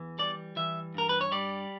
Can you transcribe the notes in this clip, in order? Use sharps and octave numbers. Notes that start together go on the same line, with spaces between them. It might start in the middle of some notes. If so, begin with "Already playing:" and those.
Already playing: E2 E3
G3 D5
E3 E5
G2 A#4
B4
C#5
G3 D5